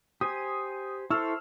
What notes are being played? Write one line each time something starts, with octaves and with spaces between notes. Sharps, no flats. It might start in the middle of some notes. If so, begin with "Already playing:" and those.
G4 C5 G#5 D#6
E4 A4 C5 C#6 E6 F6